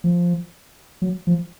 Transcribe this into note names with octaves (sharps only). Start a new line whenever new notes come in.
F3
F#3
F3